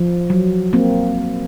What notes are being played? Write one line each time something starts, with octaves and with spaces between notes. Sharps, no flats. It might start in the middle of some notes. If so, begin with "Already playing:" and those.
Already playing: F3
F#3
A#3 C4